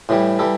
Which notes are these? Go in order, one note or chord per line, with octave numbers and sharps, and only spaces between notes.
A2 E3 G3
E3 G3 A4